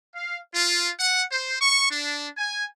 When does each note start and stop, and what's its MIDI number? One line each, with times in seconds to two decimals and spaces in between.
0.15 0.38 77
0.53 0.92 65
1.00 1.22 78
1.32 1.56 72
1.61 1.89 85
1.91 2.27 62
2.37 2.65 80